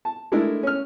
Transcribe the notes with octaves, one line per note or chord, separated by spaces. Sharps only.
A5
G#3 A3 D4 E4 A4 A#4
C#4 F6